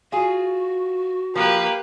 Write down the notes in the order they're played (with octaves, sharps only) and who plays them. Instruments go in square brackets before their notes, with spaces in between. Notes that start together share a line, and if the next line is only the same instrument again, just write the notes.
[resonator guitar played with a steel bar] F4 G#4 [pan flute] F#4
[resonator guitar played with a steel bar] F3 [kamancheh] A#3 [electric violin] G4 B4